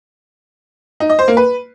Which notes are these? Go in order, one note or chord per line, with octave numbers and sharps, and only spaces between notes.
D#4
D#5
C5
A#3
B4